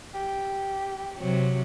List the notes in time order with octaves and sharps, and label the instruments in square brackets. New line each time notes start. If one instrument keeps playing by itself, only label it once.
[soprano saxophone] G4
[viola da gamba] C3 F#3